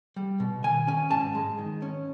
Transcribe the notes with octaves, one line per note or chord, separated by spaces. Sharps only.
G3
B2
D#3 G#5
C#4 G#5
G#2 A5
G#3
D#3
C#4